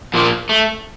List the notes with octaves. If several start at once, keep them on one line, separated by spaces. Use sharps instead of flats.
A#2 F3 A#3
A3